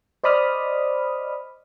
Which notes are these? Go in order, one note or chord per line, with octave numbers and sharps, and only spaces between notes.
C5 D5 D#5 B5 D#6 F6